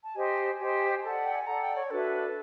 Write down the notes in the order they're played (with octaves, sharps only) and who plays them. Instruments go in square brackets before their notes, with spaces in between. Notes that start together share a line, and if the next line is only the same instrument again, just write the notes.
[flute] A5
[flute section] G4 C5 D#5 [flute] G#5
[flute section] G4 C5 D#5
[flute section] A4 D5 F#5 [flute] A5
[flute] G5
G#5
[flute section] A4 D5 F#5 [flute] A#5
[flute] G5
C#5
[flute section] D4 F#4 B4 E5 [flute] A4